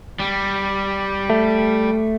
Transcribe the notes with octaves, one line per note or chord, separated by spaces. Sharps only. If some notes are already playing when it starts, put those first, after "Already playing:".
G3
A3